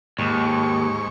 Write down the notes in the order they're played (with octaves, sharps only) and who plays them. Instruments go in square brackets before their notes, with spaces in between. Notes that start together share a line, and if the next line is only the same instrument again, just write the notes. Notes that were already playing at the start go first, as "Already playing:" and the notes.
[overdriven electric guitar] D#2 [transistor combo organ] G#2 C#6